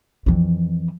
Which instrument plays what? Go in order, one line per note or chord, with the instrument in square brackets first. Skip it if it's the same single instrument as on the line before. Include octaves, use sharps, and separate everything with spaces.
[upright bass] F2 E3